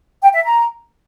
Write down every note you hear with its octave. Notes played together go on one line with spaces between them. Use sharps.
G5
E5
A#5